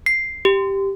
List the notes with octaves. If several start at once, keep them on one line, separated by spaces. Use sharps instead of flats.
C7
G4